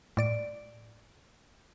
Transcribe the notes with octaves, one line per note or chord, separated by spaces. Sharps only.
A2 D5 D7